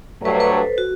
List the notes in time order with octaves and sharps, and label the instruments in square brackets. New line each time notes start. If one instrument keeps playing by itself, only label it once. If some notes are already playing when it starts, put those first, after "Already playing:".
[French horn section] G2 F#3 A3 [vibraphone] B4
[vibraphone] C5
B4
A4
F#4